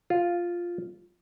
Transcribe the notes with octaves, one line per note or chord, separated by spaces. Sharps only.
F4